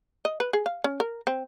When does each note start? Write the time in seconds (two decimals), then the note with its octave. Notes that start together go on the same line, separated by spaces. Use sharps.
0.25 D#5
0.40 B4
0.53 G#4
0.66 F5
0.84 C#4
1.00 A#4
1.27 C4